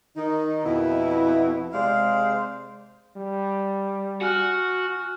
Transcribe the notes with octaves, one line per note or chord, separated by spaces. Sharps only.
D#3 D#4
F2 B2 E4
C3 G#3 C5 D5 F5
G3
F#4 G#5 F6 F#6